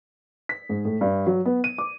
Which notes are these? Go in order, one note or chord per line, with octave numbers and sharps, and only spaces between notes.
B6
G#2
A2
G2
F#3
B3
D#7
D6